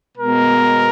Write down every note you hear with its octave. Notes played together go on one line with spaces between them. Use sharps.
B2 G#3 B3 A#4